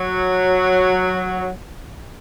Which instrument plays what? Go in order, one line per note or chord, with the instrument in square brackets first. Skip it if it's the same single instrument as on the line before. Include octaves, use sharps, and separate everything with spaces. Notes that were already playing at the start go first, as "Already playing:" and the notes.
Already playing: [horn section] F#3